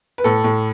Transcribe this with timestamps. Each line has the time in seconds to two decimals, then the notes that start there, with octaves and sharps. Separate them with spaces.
0.18 B4
0.24 A2 A4
0.44 A2